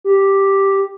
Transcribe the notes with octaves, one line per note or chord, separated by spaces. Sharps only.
G4